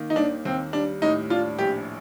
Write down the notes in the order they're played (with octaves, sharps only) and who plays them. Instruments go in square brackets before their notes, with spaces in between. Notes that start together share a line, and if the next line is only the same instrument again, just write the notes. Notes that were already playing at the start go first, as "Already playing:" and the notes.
Already playing: [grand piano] D#3 A#3
[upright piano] D#4
[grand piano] D#2 [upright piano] D4
[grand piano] D#2 [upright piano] C4
[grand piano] G3 [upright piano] D4
[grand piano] A2 [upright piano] D#4
[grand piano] D4 [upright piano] F4
[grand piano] A#1 [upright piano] G4